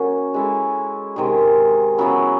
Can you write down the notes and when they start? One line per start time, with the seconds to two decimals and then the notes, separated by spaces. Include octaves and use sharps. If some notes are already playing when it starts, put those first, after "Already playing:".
Already playing: F#3 A#3 C#4
0.34 G#3 C#4 E4 A4
1.16 C3 D#3 G#3
1.98 C#3 F#3 B3 E4